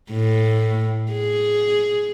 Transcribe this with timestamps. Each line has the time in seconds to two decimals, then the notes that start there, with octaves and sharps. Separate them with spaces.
0.11 A2
1.12 G#4